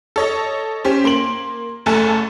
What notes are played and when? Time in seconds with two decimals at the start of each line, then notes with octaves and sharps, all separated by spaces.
0.16 A4 C#5 D#5
0.85 C#4 G4 C5
1.04 A#3 C6 D7 F#7
1.86 F#1 F#2 A3 A4 G#5